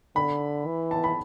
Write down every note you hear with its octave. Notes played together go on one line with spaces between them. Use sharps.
D3 B5
E3
A5
B5